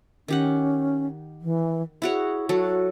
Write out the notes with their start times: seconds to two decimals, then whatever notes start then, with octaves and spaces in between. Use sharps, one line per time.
0.28 D#3 C#4 G4 F#5
1.41 E3
2.02 E4 F#4 G#4 C#5
2.49 F#3 F#4 A4